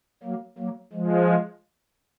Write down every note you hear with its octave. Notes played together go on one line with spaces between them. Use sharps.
F#3 A#3
F#3 A#3
F3 G#3